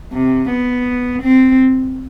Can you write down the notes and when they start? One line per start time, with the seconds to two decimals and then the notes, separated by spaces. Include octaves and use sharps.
0.13 C3
0.50 B3
1.23 C4